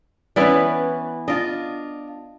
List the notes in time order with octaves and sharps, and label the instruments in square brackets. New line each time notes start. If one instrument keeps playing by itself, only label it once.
[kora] E3 B3 E4 [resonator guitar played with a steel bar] C#4 B4 D5
[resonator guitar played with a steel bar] D4 F4 [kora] D#5